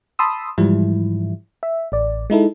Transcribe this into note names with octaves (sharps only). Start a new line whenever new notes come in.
A5 B5 C6 D#6 E6
G#2 E3 F3 G3 E4
E5
A1 D5
G#3 D#4 E4 A4